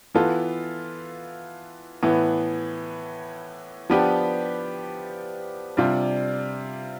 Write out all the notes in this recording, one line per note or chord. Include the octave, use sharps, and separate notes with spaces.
E3 B3 F4 A4
A2 E3 B3
F3 B3 D4 G4 B4
C3 G3 D4 F4